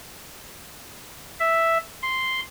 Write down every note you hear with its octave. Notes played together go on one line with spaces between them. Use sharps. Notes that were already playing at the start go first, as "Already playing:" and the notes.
E5
C6